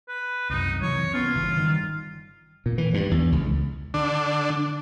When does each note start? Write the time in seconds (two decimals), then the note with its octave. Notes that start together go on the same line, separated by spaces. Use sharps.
0.08 B4
0.50 C2 F#2 D#4
0.82 C3 E3 F#3 C#5
1.14 A#3 B3 C#4 F4
1.34 G1 C#3 E3
1.56 G1 D#3 G3
2.66 A#2
2.78 E3
2.94 G2
3.11 E2
3.32 C#2
3.94 D3 D4